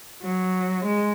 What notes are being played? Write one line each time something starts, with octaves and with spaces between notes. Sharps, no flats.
F#3
G#3